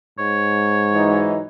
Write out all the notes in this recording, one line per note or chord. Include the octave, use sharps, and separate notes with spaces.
G#2 C#5
E3 F#3 D#4